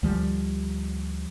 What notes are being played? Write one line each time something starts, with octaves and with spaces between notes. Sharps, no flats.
D2 F3 G3